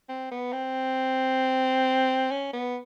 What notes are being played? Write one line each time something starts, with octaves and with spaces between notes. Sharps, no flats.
C4
B3
C4
C#4
B3